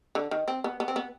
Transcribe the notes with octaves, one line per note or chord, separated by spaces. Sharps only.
D3
D#3
C4
B3
B3
C4
B3